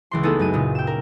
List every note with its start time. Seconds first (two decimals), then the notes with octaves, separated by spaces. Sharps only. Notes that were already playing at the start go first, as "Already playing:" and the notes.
0.11 C#2 E3 C6
0.23 A3 B3 D#4 E4 G#4 A4
0.39 F#2 G#3 D#7
0.54 A#2 C#3 D#4
0.75 G5 E7
0.87 A#4